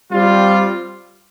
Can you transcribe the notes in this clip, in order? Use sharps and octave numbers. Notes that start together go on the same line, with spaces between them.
G3 C4 F4